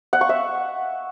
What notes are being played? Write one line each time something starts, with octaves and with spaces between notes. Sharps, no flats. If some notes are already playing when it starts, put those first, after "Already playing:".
F#5
C#6
E5